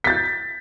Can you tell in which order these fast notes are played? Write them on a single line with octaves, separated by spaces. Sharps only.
B6 A6 G6